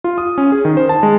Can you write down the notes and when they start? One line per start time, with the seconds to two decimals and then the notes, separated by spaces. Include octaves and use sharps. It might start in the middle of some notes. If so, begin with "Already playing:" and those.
0.04 F4
0.18 D#6
0.38 C#4
0.52 G#4
0.65 D#3
0.77 C5
0.89 A5
1.03 G#3